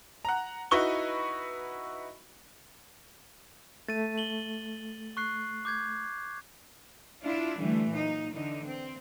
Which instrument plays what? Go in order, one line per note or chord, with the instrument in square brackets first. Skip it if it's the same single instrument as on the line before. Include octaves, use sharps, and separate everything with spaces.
[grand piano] F#5 A#5
D#4 E4 F#4 B4 C#6 G7
[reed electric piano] A3 [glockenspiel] A6 D#7
[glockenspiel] F#7 G7
C#6 F#6 C7
D6 G6 G#6
[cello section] D4 E4 F4
D3 E3 G3 A3
A#2 F#3 D#4
D3 E3 D#4
C4